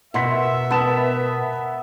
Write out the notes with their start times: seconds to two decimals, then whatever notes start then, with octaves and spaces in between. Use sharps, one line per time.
0.14 B2 A#4 E5 F#5 C6 B6
0.71 B3 B4 A5 E7